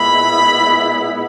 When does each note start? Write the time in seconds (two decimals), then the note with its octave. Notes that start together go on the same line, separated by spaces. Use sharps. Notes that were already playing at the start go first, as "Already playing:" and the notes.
Already playing: A#2 G#3 B3 E4 B5